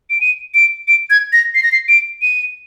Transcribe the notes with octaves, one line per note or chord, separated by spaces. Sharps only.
D7
D#7
D7
D7
G#6
A#6
C7
A#6
C7
D7
D#7